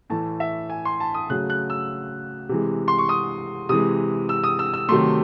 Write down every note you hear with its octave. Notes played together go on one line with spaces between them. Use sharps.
A2 E3 A3 A5
E5
G#5
C6
A5
D#6
C#3 F#3 A3 F#6
F#6
E6
C3 E3 G#3
C6
C#6
D#6
C3 E3 G#3 D#6
E6
D#6
E6
E6
C3 D#3 F#3 A3 C6